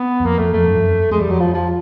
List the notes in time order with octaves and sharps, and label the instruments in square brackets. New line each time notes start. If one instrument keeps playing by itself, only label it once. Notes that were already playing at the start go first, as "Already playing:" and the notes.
Already playing: [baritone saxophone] B3
[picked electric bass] E2
[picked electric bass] F2 [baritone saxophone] A#3
[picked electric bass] F2 [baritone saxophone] A3
[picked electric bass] F2 [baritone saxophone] A3
[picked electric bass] F#2
F2
F#2
[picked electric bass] F2 [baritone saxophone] G#3
[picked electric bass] E2 [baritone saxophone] G3
[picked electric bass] F2 [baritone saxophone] F#3
[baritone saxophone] F3
F3